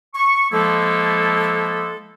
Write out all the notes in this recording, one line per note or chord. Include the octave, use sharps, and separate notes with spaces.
C#6
F3 G#3 A#3 E4 A4